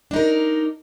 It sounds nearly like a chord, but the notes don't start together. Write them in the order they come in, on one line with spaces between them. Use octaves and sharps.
D4 D#4 A#4